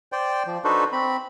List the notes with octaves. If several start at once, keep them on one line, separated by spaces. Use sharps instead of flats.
C5 D5 G5
F3
D4 D#4 F#4 A4 B4 C5
C4 B5